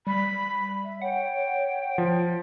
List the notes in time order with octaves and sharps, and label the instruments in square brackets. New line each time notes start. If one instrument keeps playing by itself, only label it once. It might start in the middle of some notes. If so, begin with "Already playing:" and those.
[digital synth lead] G3 [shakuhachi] B5
[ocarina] E5
[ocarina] C#5 [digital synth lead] F#5 [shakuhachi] G5
[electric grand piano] F3 [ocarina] F4